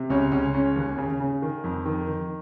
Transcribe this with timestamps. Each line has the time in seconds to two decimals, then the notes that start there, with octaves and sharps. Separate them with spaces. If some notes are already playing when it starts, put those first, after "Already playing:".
Already playing: C3
0.10 C#2 C#4
0.32 C#2 C#4
0.54 C#3 C#4
0.76 D#2
0.98 C#3
1.20 C#3
1.42 D#3
1.64 F2
1.86 D#3
2.08 D#3